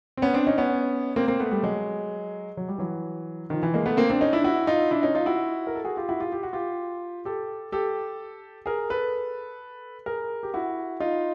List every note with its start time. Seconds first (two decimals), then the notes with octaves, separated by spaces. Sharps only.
0.17 C4
0.22 B3 C#4
0.34 C4 D4
0.47 C#4 D#4
0.58 B3 C#4
1.16 A#3 C4
1.28 A#3 C4
1.40 A3 B3
1.51 G3 A3
1.63 F#3 G#3
2.57 F#3
2.69 G3
2.78 E3 F#3
3.50 D#3 F3
3.63 E3
3.74 G#3 A#3
3.86 A3 B3
3.97 A#3 C4
4.10 C4 D4
4.21 C#4 D#4
4.33 D4 E4
4.44 E4 F#4
4.67 D#4 F4
4.91 D4 E4
5.03 C#4 D#4
5.15 D#4 F4
5.26 E4 F#4
5.67 A#4
5.75 A4
5.84 F#4 G#4
5.97 F4 G4
6.09 E4 F#4
6.20 F4 G4
6.32 G4
6.43 F#4
6.53 F4 G4
7.25 G4 A4
7.72 G4 A4
8.66 G#4 A#4
8.90 A4 B4
10.06 G#4 A#4
10.43 G4
10.54 E4 F#4
11.00 D#4 F4